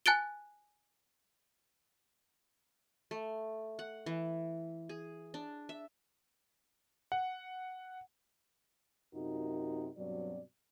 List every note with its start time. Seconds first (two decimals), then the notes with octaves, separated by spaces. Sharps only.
0.06 G#5 A5 F#6 A6 D7 G7
3.11 A3
3.79 F#5
4.06 E3
4.89 G#4
5.34 D4
5.69 E5
7.12 F#5
9.14 F#2 C3 D#4 F4 F#4 A#4
9.97 G2 B2 F#3 C4 D5